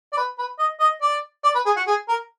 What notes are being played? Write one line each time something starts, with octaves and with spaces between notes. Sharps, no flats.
D5
B4
B4
D#5
D#5
D5
D5
B4
G#4
F#4
G#4
A#4